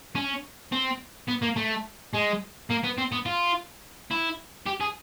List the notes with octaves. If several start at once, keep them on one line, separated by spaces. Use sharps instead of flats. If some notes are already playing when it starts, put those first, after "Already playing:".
C#4
C4
B3
A#3
A3
G#3
A#3
B3
C4
B3
F4
E4
G4
G#4